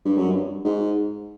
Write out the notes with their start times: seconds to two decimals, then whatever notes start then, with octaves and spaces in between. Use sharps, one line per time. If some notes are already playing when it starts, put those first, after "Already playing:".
0.05 G2
0.18 F#2
0.32 G2
0.65 G#2